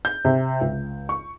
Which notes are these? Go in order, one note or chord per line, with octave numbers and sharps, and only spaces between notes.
G6
C3
C#2
C#6